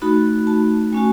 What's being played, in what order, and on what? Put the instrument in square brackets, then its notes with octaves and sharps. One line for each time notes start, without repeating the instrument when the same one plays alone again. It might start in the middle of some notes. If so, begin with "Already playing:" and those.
[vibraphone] A3 D#4 F#4 B5
A5
A3 C#4 F#4 G#5